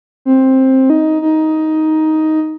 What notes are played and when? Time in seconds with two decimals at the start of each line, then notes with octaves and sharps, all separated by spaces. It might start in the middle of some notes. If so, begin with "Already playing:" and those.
0.25 C4
0.90 D#4
1.22 D#4